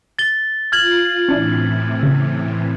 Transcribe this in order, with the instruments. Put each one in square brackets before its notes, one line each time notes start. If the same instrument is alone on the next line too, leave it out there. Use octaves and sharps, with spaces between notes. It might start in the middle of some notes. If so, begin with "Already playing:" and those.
[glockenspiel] A6 G7
[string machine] F4 [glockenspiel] F6 G#6 F#7
[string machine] A2 C3 E3 [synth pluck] C#4 D4 E4
[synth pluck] C#3